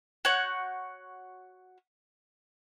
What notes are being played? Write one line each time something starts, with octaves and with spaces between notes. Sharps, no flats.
F#4 C#5 F#5 G6